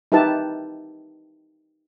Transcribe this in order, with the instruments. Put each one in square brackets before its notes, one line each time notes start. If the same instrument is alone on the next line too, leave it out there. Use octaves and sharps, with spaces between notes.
[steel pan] D#4 E4 G4 B4 A5